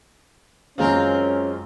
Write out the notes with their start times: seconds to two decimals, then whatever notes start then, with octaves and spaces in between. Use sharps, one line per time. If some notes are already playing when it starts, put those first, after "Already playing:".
0.78 F#2 G#3 C4 C#4 F4 A#4 F5